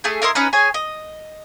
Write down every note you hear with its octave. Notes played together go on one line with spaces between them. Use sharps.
A3 G#4
E4 A#4 D#5 C6
C#4 D#4 B4
G#4 C#5 G#5
D#5